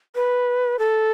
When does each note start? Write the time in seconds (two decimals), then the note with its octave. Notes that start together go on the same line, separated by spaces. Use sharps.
0.15 B4
0.79 A4